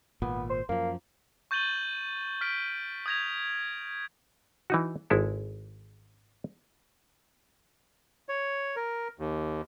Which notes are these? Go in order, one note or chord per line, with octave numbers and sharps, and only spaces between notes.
G#1 A#2 B3
C5
F#2 F3 A#3
C#6 G6 A6 D#7 F#7 G7
F6 B6 D7 G7
D#6 G6 G#6 A#6 F7
E3 D#4 F#4
G#1 G#3 E4 A4
C#5
A#4
D#2